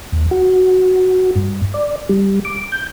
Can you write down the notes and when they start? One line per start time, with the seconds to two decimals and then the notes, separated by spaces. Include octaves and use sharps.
0.12 D#2
0.31 F#4
1.35 G2
1.74 D5
2.09 G3
2.45 D6
2.72 G6